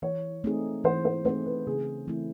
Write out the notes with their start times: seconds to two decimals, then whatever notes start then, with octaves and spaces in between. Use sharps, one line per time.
0.02 E3 C#5
0.44 A3 C4 D#4 G#4
0.84 E3 C5
1.05 C5
1.25 A3 C4 D#4 G#4 C5
1.46 B4
1.67 C#3 G#4
2.08 E3 A3 C4 E4